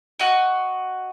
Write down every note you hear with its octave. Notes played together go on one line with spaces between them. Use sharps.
F#4 D#5